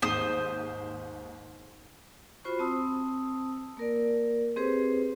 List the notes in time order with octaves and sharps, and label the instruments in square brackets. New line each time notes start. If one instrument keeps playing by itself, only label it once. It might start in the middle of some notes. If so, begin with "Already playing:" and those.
[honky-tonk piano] D#2 G#2 [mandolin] C5 D#6
[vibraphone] F4 F#4 C5 B5 C#6
C4 A5 D#6 E6
A#3 A#4 D5
C4 G4 G#4 B4 C5